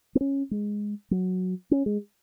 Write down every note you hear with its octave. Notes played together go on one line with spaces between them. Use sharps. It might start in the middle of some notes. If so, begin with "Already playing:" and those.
B3
C#4
G#3
F#3
C#4
G#3